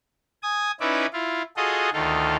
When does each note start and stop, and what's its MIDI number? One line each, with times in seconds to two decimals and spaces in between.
0.43 0.71 80
0.43 0.71 87
0.80 1.06 61
0.80 1.06 63
0.80 1.06 64
0.80 1.06 71
0.80 1.06 74
0.80 1.06 76
1.13 1.42 64
1.13 1.42 65
1.57 1.90 65
1.57 1.90 66
1.57 1.90 68
1.57 1.90 69
1.57 1.90 75
1.93 2.37 38
1.93 2.37 51
1.93 2.37 65
1.93 2.37 69